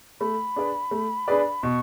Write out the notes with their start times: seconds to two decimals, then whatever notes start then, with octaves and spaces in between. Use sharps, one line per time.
0.20 A3 B5
0.56 D4 G#4 B4 D5
0.91 A3
1.28 D4 G#4 B4 D5
1.63 B2 C#6